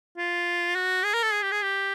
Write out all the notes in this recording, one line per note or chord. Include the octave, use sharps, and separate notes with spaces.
F4
F#4
G#4
A#4
A4
G#4
G4
G#4
G4